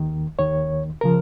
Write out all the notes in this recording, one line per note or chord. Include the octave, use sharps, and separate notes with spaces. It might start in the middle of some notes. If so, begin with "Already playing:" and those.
Already playing: D#2 D#3
D#2 D#3 C#5
C#3 F3 A#4